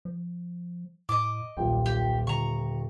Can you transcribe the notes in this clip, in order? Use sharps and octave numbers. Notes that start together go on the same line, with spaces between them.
F3
A2 D#5 D6
D#1 B1 F4 G5
G4
D3 A#5 C#6